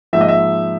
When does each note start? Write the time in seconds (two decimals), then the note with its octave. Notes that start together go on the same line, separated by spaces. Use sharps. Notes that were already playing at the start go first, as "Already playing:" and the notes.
0.13 G#2 F3 A#3 E5
0.21 D#5
0.28 E5